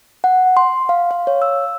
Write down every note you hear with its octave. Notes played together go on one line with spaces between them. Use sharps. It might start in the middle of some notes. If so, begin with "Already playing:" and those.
F#5
C6
F5
F5
C#5
E6